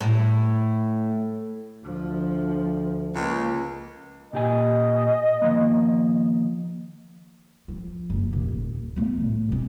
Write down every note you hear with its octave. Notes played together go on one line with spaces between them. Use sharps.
A2
D2 F3
C#2 A#3
A#2 G4 D#5 G#5
D#3 F3 A#3
F3
F#1
D#1 D#2
A3 B3
A2
B2 C4